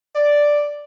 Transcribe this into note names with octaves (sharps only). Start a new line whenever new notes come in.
D5